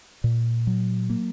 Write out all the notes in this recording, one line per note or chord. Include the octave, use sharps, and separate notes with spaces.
A#2
F#3
A#3